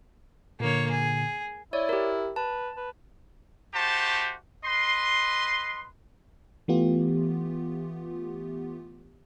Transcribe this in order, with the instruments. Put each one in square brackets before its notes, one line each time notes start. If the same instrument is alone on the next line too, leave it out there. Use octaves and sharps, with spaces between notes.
[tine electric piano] A#2 D3 [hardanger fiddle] A#3 C#5
[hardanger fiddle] G#4
[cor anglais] E4 [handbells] C#5 D5
[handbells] G4 A#4
[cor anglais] B4 [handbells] A5
[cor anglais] B4
[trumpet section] A3 F#4 G4 C5 A5
B4 D#5 C6
[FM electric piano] E3 A3 B3 F4 G4